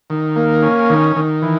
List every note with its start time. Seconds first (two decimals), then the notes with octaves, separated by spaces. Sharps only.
0.10 D#3
0.36 A#3
0.62 C#4
0.90 D#3
1.16 D#3
1.42 E3